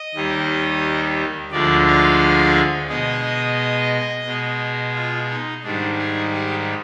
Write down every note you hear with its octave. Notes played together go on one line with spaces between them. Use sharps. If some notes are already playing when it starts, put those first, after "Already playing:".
Already playing: D#5
D#2 D#3 G3
D2 D3 F3 G#3 D5
F5
B2 G#3 D#5
B2 G#3
F4
D#4
G#2 D#3 G3 D4
G#4
G4